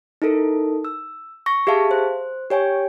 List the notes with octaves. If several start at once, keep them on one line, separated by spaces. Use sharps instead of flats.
D#4 E4 A4 A#4
E6
C#6 A#6
G4 G#4 E5 F5 A5
C5
G4 C#5 G5 G#5